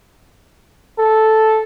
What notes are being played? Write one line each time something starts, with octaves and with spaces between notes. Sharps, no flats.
A4